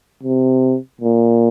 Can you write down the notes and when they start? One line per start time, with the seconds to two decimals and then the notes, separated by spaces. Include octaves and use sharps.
0.23 C3
1.01 A#2